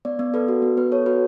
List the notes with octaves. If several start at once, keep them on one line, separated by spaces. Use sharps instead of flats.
B3 D5
B3
A4 B4
F#4
B3
B3 B4
A4 C#5
F#4 B4